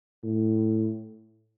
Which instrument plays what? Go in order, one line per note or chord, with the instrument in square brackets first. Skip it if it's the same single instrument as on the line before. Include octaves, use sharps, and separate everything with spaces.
[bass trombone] A2